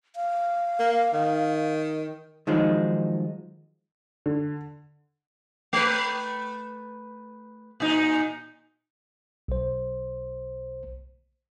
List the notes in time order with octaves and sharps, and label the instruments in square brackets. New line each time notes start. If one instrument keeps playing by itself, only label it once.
[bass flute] F5
[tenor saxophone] A#3
D#3
[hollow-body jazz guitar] D#3 F3 F#3 G#3 D#4
[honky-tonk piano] D3
[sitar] A3 B4
A#2 D#4
[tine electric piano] B1 C5